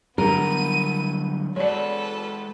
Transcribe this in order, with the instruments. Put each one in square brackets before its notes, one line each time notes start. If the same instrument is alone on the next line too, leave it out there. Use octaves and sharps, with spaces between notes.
[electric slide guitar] D3 F#3 G3 [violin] B3 D#7 [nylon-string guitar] A#4
[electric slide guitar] G#3 F#4 [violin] A4 B4 [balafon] C#5 D5